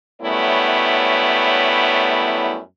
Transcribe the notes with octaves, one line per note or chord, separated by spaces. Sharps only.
F#2 G3 A3 B3 E4 C#5